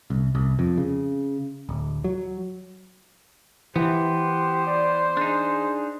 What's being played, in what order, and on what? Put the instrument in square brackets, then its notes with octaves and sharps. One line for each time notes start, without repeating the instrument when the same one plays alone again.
[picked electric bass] C2
C2
F2
C#3
D1
F#3
[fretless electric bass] E3 [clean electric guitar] B3 [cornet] G4 [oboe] C5
[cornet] D5
[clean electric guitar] D4 D#4 [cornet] G#4